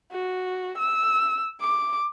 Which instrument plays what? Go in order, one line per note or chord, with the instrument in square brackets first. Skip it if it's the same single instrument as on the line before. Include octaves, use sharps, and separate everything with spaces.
[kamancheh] F#4
E6
D6